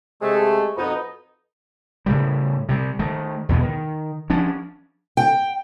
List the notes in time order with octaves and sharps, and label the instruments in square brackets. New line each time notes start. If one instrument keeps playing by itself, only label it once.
[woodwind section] C3 G#3 A3
F2 B2 B3 D#4
[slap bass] A2 C#3 G3
C3 G3
D#3 A3
E2 B2 A3 B3
D#3
F3 C#4 D4
[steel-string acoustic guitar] G5